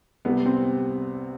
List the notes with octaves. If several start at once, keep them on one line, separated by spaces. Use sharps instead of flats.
C2 C3 G3 B3
C4